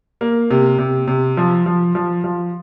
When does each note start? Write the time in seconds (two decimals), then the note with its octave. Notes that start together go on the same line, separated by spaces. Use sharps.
0.21 A#3
0.50 C3
0.79 C3
1.07 C3
1.37 F3
1.66 F3
1.95 F3
2.24 F3